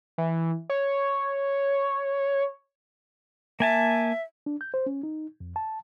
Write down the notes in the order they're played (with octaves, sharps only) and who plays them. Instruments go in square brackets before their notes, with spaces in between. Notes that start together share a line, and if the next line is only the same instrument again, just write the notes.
[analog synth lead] E3
C#5
[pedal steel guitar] A#3 G#5 A5 [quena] E5
[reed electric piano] D4
G6
C5
C#4
D#4
F2
A5